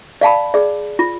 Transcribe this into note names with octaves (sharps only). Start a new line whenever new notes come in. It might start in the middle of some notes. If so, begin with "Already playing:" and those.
D5 F5 A5 B5
G#4 D5
F4